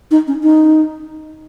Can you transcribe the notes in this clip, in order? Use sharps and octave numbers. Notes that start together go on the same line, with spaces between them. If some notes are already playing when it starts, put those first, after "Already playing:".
D#4
C#4
D#4